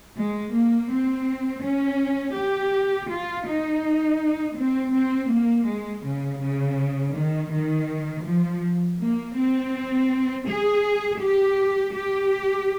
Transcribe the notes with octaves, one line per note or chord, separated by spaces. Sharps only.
G#3
A#3
C4
C#4
G4
F4
D#4
C4
C4
A#3
G#3
C#3
C#3
D#3
D#3
F3
A#3
C4
G#4
G4
G4